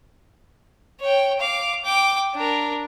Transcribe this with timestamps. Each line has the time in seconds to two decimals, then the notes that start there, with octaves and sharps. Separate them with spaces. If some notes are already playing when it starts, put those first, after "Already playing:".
1.00 C#5 G5
1.40 F5 D6
1.84 G5 D6
2.34 D4 A#4